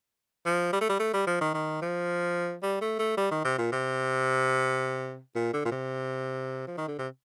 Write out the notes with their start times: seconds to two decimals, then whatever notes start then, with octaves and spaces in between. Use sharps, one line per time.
0.46 F3
0.73 G3
0.81 A3
0.89 G3
0.99 A3
1.13 G3
1.27 F3
1.41 D#3
1.54 D#3
1.82 F3
2.63 G3
2.81 A3
2.99 A3
3.17 G3
3.31 D#3
3.45 C3
3.58 A#2
3.72 C3
5.35 A#2
5.53 D3
5.65 A#2
5.72 C3
6.67 F3
6.78 D#3
6.88 D3
6.99 C3